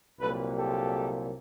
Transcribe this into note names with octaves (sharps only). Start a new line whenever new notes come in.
C2 A#2 F#3 A#3 A4 B4
G4 A4